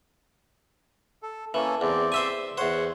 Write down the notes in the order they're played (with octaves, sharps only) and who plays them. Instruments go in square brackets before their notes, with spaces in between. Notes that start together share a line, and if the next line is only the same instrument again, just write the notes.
[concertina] A4
[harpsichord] E3 [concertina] A#3 C#4 A4
[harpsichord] E2 [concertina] C4 D5
[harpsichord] C5 E5 G#5
[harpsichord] E2 C5 [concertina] C#5 F#5